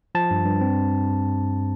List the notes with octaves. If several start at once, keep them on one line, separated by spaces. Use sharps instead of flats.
F3 A5
G2
G2
C4